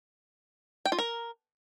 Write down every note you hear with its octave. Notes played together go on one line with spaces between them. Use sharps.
G5
F4
A#4